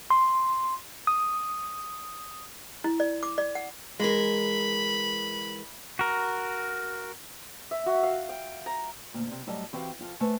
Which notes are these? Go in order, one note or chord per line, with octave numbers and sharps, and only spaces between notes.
C6
D#6
E4
D5
D6
D5
F#5
E3 G#3 A#4 B5
F#4 A#4
E5
F#4
F5
G5
A#5
D2 A#2
C3
A2 F#3 G3 A4 D#5 A5
E3 C4 F#4 G4 F5
F2 F4 A4
A3 B4 C5 G#5 A5